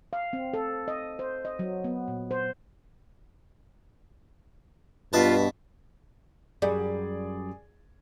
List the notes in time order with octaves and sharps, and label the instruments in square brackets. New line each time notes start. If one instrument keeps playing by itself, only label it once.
[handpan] F5
C4
A4
D#5
C5
D#5
F#3
B3
A#2
C5
[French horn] G2 [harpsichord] B2 B4 A5 [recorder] F4
[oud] F#2 G3 [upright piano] G#4 D5